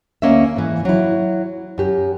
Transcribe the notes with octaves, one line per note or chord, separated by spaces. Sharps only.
D2 A#3 C#4 D#5 E5
G#2 E3
F#3 E4
F#2 G4